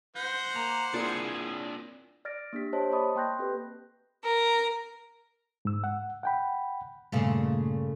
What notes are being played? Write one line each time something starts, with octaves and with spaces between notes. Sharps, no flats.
C5 F#5 G6 A#6
A#3 A#5
A#3 C4 D4 E4 F4 G#4 D5
D5 F6 A6 A#6 D7
A#3 D4 G4 B6
G4 C5 C#5 D#5 A5
D5 D#5 A5 B5 C#6 D#6
A#3 G5 C6 F#6 G6 A#6
C4 G4 A4 B4
A#4
G#2 E6
F#5
F#5 G5 B5
G2 A#2 C#3 A3